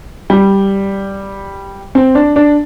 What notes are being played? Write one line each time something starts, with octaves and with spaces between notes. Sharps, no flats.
G3
C4
D4
D4